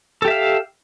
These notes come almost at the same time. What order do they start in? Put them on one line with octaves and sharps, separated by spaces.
A4 G4 E5 F5